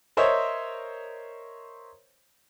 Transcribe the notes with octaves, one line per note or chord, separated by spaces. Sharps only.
A#4 C5 C#5 D#5 E5